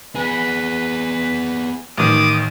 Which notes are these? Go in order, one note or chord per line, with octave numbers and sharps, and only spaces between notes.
B3 G#4 B4
A1 D#3 D6 D#6